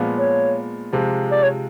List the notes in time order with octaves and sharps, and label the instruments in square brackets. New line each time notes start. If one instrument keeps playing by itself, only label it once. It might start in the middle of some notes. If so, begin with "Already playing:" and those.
Already playing: [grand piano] A#2 F3 G#3 B3
[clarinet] C#5
[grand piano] C3 F3 G#3
[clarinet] D5
C#5